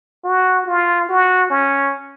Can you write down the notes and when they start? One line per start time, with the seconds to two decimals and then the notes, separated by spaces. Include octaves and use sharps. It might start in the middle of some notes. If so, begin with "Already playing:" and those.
0.24 F#4
0.66 F4
1.09 F#4
1.50 C#4